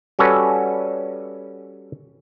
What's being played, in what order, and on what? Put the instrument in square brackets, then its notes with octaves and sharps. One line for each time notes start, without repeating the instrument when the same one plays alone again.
[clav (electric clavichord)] G3 C#4 F#4 A4 B4 C#5